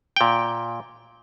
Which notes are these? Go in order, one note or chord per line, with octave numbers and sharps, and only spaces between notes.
A#2 G5